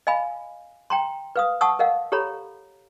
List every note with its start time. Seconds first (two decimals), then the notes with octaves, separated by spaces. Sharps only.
0.07 D#5 F5 G#5 B5
0.90 G5 A#5 C6
1.36 B4 F5 D#6
1.61 F#5 A5 C#6 D#6 E6
1.79 A#4 D#5 F5 F#5
2.12 G4 A4 C#5 A#5 B5